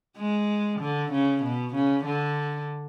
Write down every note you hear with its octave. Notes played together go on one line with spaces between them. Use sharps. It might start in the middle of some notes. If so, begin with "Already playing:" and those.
G#3
D3
C#3
B2
C#3
D3